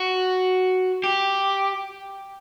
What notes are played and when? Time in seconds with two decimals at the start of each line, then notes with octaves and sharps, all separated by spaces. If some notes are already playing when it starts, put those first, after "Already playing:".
Already playing: F#4
1.04 G4